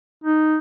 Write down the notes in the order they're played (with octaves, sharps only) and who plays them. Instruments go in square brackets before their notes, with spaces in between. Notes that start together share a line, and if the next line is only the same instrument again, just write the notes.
[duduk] D#4